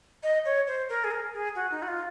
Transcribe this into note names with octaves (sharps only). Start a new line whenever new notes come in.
D#5
C#5
C5
A#4
G#4
A#4
G#4
F#4
D#4
F#4
F4